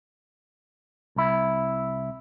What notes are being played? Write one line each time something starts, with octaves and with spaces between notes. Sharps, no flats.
C2 E4